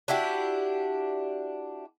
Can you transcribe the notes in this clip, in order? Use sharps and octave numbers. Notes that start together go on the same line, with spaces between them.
D4 E4 F#4 G4